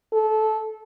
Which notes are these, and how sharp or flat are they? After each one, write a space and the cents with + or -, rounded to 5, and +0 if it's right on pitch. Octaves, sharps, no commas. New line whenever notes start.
A4 -20